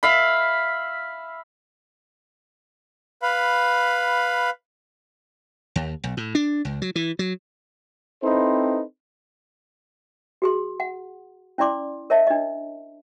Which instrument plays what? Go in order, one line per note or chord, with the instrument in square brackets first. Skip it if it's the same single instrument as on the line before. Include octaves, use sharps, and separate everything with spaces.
[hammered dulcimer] E5 F5 B5
[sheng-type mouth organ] B4 F5 B5
[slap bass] D#2
B1
A2
D4
C#2
F#3
E3
F#3
[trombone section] C4 D#4 E4 A4 B4 C5
[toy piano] F#4 G#4 C6
F#5
C#4 E4 D5 C6 D6
A#4 C#5 D#5 E5 A5
D4 D#5